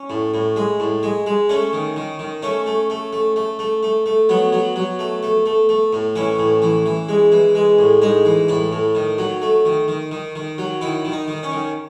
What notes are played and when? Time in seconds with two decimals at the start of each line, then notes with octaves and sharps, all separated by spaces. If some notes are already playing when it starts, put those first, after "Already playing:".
Already playing: C#4
0.10 A2
0.34 A2
0.56 G#3
0.80 A2
1.03 G#3
1.26 G#3
1.49 A3 C#4
1.73 D#3
1.97 D#3
2.19 D#3
2.42 A3 C#4
2.66 A3
2.90 A3
3.13 A3
3.36 A3
3.59 A3
3.83 A3
4.06 A3
4.29 F#3 B3
4.53 F#3
4.76 F#3
4.99 A3
5.23 A3
5.46 A3
5.69 A3
5.93 A2
6.16 E3 C#4
6.39 A2
6.62 E3
6.86 E3
7.09 G#3
7.32 E3
7.55 G#3
7.79 A2
8.02 G#3 D#4
8.25 E3
8.48 A2 E4
8.72 A2
8.95 D#3
9.18 F#3
9.42 A3
9.65 D#3
9.88 D#3
10.11 D#3
10.36 D#3
10.58 F#3
10.81 D#3 E4
11.05 D#3
11.12 D#4
11.28 D#3
11.43 C#4
11.52 D#3